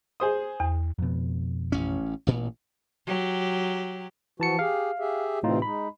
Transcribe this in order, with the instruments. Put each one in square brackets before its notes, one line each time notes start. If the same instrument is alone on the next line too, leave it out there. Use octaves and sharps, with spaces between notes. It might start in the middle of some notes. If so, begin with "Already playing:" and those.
[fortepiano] G#4 C5 D#6
[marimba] E2
[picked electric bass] F2 B2
[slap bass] A1 C#4
A1 A#2
[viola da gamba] F#3 G4
[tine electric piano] E3 A5 C#7 [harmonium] F3 F#4
[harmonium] G4 G#4 [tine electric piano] F5
[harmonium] G4 G#4 E5
[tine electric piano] A2 D#4 F4 [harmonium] C3 E3 C4
[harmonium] G#3 D#4 [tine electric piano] B5